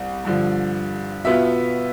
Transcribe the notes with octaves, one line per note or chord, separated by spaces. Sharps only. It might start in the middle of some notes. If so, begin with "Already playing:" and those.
Already playing: C2 G3
G2 D3 F3
B2 B3 F4 E5